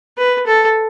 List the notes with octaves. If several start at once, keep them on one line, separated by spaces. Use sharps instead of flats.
B4
A4